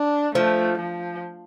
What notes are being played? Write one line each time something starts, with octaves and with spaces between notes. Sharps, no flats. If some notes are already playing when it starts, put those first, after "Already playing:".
Already playing: D4
F3 A3
F3